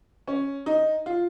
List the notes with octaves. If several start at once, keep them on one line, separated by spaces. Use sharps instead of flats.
C#4
D#4
F4